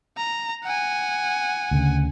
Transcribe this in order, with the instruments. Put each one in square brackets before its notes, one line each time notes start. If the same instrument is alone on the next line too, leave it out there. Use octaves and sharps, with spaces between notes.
[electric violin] A#5
F#5 G#5
[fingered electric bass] D2 C#3